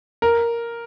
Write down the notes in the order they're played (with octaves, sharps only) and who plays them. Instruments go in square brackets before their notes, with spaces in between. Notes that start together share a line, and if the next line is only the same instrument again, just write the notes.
[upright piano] A#4